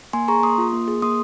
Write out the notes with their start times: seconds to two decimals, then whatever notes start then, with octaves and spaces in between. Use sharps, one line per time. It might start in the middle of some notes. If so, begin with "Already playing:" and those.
0.13 A#3 G#5 C6
0.28 G#4 A#5 C#6
0.43 A#3 C6 D#6
0.58 F4
0.73 A#3
0.88 G#4
1.02 A#3 C6 D#6